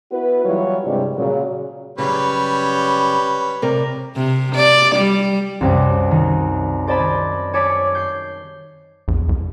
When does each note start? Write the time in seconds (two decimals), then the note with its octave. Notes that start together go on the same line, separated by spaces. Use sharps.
0.11 B3 E4 F#4 B4
0.45 E3 F#3 G3 E4 F4 C#5
0.85 G2 C3 G3 G#3
1.17 A#2 C#3 F#3
1.98 F#2 C#3 G3 B4 C#5
3.62 C3 A#4 D5
4.16 C3
4.54 D5
4.95 G3
5.61 C2 F#2 C3 G3
6.11 D#3
6.87 C5 D5 D#5 G#5 A5 B5
7.53 C#5 G#5 A5 D6 B6
7.95 G6 C7
9.08 A#1 E2
9.29 C2